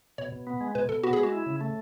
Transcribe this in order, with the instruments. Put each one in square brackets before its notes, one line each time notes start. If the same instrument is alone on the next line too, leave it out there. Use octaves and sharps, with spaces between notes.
[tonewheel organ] B2 [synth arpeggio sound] C#5
[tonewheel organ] B2
B3
G#3
[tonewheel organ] B2 [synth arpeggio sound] B4
[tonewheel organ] B2 [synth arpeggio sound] A4
[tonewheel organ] B3 [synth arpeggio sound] F#4
[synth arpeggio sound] G#4
[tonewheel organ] G#3
[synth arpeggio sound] F#4
[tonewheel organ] E4
C#3
A3